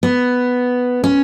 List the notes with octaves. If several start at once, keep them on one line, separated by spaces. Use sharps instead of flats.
B3
C#4